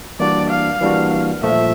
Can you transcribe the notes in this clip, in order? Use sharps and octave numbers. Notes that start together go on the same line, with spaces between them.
E3 G3 A#3 D4 F#4 D5
F5
E3 G3 A#3 D4 F#4
A#2 F3 A3 E5